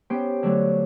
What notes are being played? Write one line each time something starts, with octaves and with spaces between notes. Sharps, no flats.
B3 C#4 G4 C5 G5
D3 F#3 A3